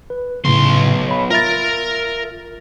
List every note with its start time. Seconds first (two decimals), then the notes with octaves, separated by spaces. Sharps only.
0.10 B4
0.45 B1 A2 C#3 C6
1.08 C#5 B5
1.30 F4 A#4 E5 A6